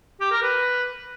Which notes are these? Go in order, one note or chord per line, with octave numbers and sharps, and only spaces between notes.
G4
A#4
B4